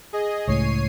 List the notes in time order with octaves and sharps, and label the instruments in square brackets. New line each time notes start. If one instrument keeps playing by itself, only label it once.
[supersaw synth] G#4 D#5
[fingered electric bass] C#2 A2 [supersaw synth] C#5 C7 D#7